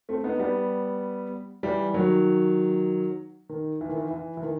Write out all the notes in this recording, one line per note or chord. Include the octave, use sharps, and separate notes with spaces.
A3 C4
B3 D#4
G3 B3
E3 G3
D#3 F#3
D#3
E3
D#3
E3
E3
E3
D#3